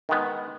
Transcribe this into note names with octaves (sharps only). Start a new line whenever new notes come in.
D#3 G#3 B3